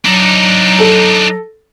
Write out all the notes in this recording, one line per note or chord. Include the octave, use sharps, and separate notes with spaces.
F#3 D4 D#4
A4